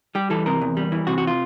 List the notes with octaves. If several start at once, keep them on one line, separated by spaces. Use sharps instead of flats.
G3 G4
E3 A4
C3 A#4
E2
G3
E3
C3 F#4
F#4
F4